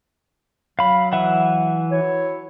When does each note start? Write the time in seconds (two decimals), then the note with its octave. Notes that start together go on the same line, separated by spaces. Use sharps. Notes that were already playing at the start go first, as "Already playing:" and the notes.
0.79 F#3 F5 B5
1.13 E3 E5 F#5
1.91 F#3 E4 C#5